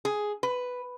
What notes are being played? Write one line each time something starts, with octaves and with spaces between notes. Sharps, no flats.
G#4
B4